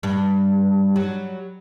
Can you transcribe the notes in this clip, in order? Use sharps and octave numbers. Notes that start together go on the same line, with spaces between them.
G2 G3
F#3 G3